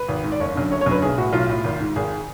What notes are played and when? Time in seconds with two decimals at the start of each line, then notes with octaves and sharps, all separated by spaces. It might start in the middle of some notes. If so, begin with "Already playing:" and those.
Already playing: B4
0.08 G#1
0.24 G#2
0.32 D5
0.40 F#1 C#5
0.55 F#2 D3
0.71 F#1 C#5
0.81 C#5
0.86 F#2 D3 B4
1.02 B1 G#4
1.18 A2 F#4
1.33 B1 F4
1.49 A2
1.64 G#1
1.80 G#2
1.96 G#1 G#4